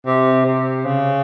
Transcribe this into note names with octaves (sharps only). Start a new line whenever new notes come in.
C3
C3
C#3